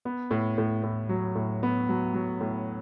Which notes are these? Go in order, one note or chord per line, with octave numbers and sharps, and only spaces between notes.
B3
A2
A2
A2
F#3
A2
B3
F#3
F#3
A2